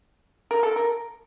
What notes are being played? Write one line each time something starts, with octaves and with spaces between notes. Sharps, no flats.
A#4
A4
A#4